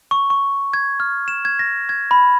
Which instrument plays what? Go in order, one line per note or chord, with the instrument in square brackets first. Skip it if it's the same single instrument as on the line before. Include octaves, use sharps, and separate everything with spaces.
[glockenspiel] C#6
C#6
G#6
F6
E7
G#6
A#6
G#6
B5